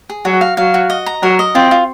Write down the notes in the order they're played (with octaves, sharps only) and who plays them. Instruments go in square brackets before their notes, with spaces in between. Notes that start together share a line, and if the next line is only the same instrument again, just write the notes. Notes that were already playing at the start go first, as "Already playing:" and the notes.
[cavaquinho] G#4
[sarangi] F#3 [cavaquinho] F#4
[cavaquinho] F5
[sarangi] F#3 [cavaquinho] F5
[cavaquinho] F#4
D#5
A#5
[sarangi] F#3 [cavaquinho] A#4
[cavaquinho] D#5
[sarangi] C4 [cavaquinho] F4
[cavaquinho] F4